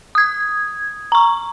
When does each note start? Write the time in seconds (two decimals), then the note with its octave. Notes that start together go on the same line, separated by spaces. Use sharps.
0.15 D#6 G#6
1.12 A#5 C#6